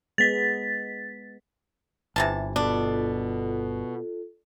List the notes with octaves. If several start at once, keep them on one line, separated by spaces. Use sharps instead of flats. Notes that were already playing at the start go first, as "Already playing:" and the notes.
G#3 B3 A6 B6
G1 C3 E3 A5
B2 D4 F4 A4